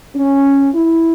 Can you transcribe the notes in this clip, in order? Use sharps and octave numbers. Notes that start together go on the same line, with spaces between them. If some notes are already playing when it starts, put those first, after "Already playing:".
C#4
E4